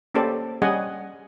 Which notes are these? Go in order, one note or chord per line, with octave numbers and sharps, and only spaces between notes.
A#3 C#4 G4 A4 C5 D5
G3 C#4 G#4 D#5 F#5 G#5